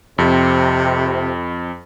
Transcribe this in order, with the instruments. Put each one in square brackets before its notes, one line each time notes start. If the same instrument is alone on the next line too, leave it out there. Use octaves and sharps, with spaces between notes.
[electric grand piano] F2 [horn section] C3